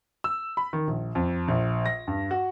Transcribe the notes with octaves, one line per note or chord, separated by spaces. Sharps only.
E6
B5
D#3
A#1
F2
A#1
A#6
G2
F#4